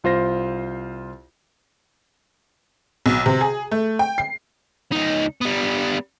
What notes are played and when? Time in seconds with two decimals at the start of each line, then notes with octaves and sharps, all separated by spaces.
0.04 C2 F4 C5 A#6
3.06 B1
3.26 C3
3.41 G#4
3.71 A3
3.99 G5
4.18 C7
4.92 C#2 D#4
5.41 G3 B3